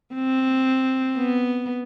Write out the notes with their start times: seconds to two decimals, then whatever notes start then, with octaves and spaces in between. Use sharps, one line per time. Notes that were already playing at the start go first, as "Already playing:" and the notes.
0.14 C4
1.17 B3